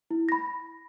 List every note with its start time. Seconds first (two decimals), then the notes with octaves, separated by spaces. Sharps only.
0.11 E4
0.29 B5 A#6